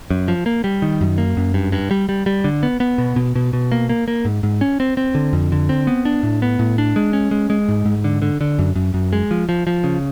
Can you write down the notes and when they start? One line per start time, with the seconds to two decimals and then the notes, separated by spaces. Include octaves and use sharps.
0.10 F#2
0.28 F3
0.46 A#3
0.64 G3
0.82 D#3
1.01 F#2
1.18 A#3
1.37 F#2
1.54 G2
1.72 G2
1.91 G3
2.09 G3
2.26 G3
2.44 D3
2.63 B3
2.80 B3
2.98 B2
3.16 B2
3.35 B2
3.53 B2
3.72 A#3
3.89 A#3
4.08 A#3
4.25 G#2
4.43 G#2
4.61 C#4
4.80 C4
4.97 C4
5.15 D3
5.33 F2
5.52 D3
5.69 C4
5.87 B3
6.05 D4
6.23 A2
6.42 B3
6.59 A2
6.78 D4
6.96 G#3
7.13 C#4
7.31 G#3
7.50 G#3
7.68 G#2
7.85 G#2
8.04 D3
8.22 D3
8.41 D3
8.59 F#2
8.75 F#2
8.94 F#2
9.13 G#3
9.31 F3
9.49 F3
9.67 F3
9.84 C#3